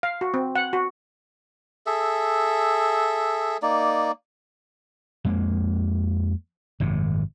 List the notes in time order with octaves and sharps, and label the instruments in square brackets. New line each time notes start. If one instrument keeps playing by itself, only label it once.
[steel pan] F5
F#4
C4
F#5
F#4
[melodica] G#4 A4 E5
A#3 D#4 D5
[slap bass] F2 G#3 A#3
G#1 F#2 C3